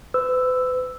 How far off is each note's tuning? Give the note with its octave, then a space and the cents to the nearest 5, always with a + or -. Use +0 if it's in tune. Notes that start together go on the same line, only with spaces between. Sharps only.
B4 +40 E6 +0